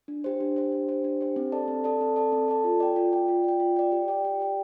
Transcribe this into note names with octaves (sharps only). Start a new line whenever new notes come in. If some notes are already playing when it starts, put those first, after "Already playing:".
D4
G4 C5
D4
G4 C5
D4
G4 C5
D4
G4 C5
C4
A4 D5 A5
C4
A4 D5 A5
C4
A4 D5 A5
C4
A4 D5 A5
F4
D5 G5
F4
D5 G5
F4
D5 G5
F4
D5 G5
G4
D5 G5
G4
D5 G5